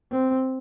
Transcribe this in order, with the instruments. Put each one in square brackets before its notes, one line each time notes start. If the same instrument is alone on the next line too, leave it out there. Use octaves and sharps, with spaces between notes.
[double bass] C4